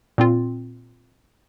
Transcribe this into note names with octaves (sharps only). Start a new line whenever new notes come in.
A#2 C4 F4